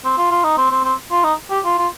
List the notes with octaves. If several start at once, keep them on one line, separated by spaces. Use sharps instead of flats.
C4
F4
F4
D#4
C4
C4
C4
F4
D#4
G4
F4
F4